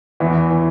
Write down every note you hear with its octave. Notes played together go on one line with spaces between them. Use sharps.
E2 E3
E3